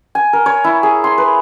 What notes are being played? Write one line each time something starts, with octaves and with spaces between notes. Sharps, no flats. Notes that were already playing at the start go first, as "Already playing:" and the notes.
G#5
A#4
C#5
E4
G#4
C6
B4